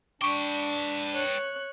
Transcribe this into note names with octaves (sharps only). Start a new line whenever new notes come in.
D4 B4 G5 C#6 D6
C#5 F#6